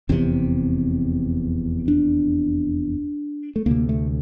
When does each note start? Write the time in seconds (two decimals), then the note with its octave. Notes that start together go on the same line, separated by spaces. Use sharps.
0.09 F1 E2 C3 C4
1.88 D4
3.56 A3
3.66 D2 C3 A#3
3.89 A3